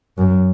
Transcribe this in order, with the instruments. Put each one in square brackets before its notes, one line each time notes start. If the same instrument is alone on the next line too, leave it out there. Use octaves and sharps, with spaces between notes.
[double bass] F#2